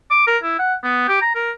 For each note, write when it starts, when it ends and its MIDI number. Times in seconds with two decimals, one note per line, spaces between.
0.10 0.27 86
0.27 0.38 70
0.43 0.56 64
0.59 0.74 78
0.84 1.04 59
1.08 1.18 67
1.22 1.34 82
1.35 1.51 70